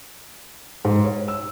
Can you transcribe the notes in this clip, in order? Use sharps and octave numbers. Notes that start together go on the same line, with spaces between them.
G#2
C#5
E6